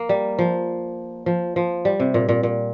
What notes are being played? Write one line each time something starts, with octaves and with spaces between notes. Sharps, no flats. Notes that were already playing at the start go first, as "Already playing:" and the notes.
Already playing: A#3
G3
F3
F3
F3
G3
C3
A#2
A#2
A#2